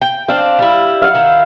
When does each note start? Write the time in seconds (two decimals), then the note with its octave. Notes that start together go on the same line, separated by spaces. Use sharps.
0.02 G5
0.28 C4 D4 F5
0.59 G3 E4
1.02 F5 F#5
1.14 D#3 E4